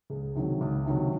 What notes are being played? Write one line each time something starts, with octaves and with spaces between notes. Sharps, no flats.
C#2 G#4
C3 D#3 F#3
C#2
C3 D#3 F#3